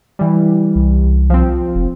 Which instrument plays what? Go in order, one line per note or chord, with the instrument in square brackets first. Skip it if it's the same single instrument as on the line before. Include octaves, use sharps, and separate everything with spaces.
[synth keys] E3 G3
[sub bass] C2
[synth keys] F3 C4
[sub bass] F1